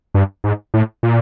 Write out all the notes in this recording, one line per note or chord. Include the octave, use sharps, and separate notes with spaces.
G2
G#2
A2
A#2